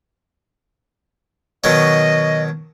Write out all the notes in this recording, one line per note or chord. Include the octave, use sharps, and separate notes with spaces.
B2 D#3 F#3 D#5